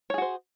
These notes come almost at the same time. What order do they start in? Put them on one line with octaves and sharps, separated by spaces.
C#5 G#4 F#4 C5